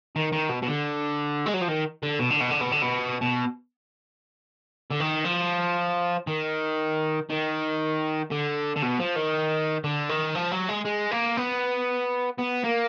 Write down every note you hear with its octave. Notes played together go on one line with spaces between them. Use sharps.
D#3
D#3
B2
B2
D3
G#3
F#3
F3
D#3
D3
B2
D3
B2
D3
B2
D3
B2
B2
D3
D#3
F3
D#3
D#3
D3
D3
B2
F3
D#3
D3
D#3
F3
F#3
G#3
G#3
A#3
B3
B3
A#3